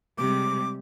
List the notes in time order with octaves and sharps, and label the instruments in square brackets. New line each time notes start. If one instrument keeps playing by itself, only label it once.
[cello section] C3 G3 G#3 [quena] D6